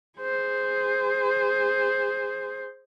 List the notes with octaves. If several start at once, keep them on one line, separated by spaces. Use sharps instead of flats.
G#4 C5